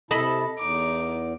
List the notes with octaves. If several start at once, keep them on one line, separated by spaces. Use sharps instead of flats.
C3 E4 A4 D#5 A5 B5
E2 D#4 D6